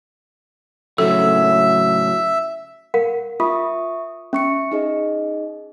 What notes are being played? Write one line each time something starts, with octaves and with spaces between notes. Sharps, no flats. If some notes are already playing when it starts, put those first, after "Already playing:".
A2 C#3 F#3 A4 E5
A#4 F5 F#5
F4 E5 C#6 D#6
C#4 E5 C#6 C#7
D#4 G#4 D#5